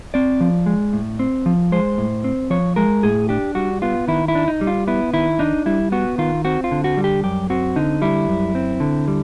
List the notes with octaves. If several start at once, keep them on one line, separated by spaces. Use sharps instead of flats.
C4 D5
F3
G#3
A2
C4
F3
G#3 C5
A2
C4
F3 C#5
G#3 A#4
A2 G#4
D4 G4
G3 F#4
B3 F4
D#3 E4
E4
D4
D#4
G3
F4
B3 E4
D#3 E4
D4 D#4
G3 E4
B3 F#4
D#3 F4
C4 F#4
F4
D3
F#4
G3
G4
F#2 G4
C4 F#4
D3 D#4
G3 E4
F#2
C4
D3
G3